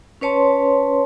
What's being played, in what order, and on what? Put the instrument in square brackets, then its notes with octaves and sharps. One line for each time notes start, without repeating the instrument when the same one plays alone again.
[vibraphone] C#4 B4 C#5 A5 C6